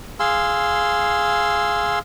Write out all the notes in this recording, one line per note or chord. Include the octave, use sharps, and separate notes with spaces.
G#4 F5 C6 E6